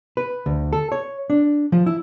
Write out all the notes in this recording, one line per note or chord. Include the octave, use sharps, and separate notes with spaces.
B4
D2
A4
C#5
D4
F3
E4